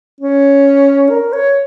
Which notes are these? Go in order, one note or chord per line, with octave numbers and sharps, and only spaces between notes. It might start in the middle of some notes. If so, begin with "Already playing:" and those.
C#4
A#4
C#5